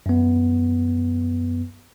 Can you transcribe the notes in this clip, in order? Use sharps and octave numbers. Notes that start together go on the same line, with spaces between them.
F#2 B3